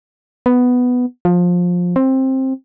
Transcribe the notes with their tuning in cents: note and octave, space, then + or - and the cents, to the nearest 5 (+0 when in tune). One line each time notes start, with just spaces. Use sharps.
B3 +5
F3 +20
C4 +15